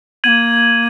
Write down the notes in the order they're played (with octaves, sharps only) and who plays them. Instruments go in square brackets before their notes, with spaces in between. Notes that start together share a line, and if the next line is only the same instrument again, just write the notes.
[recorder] B3 [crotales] G#6 D#7 F#7
[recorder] A#3